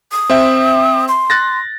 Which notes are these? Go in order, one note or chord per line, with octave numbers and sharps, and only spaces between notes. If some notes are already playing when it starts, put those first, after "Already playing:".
D#6
C4 E5 G5
C6
F#6 A6 A#6